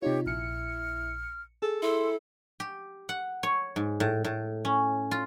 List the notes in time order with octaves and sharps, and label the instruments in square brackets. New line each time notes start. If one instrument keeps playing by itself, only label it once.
[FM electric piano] C3 D#4 F4 [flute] G4 [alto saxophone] C#5
[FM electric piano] A#1 C#7 [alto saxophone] E4 [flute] F6
[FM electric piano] G#4 [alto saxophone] A4
[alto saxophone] E4 [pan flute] A4 [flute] C6
[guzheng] G4
F#5
C#5
G#2
A2
A2
C#4
F4